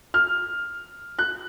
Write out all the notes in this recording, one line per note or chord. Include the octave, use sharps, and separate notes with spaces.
F6
F#6